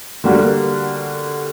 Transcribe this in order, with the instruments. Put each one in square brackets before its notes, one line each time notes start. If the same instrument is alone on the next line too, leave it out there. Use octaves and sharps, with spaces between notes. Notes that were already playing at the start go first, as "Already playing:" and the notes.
[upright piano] D3 G3 A#3 F#4